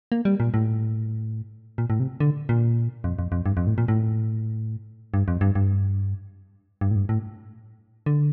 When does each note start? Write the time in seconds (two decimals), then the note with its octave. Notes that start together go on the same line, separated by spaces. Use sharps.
0.12 A#3
0.25 G3
0.40 A#2
0.54 A2
1.78 A#2
1.90 A2
2.00 C3
2.20 D3
2.49 A#2
3.04 F2
3.19 F2
3.32 F2
3.46 G2
3.57 F2
3.67 A2
3.78 A#2
3.88 A2
5.14 G2
5.28 F2
5.41 G2
5.55 G2
6.81 G2
6.91 A2
6.95 G2
7.09 A2
8.06 D3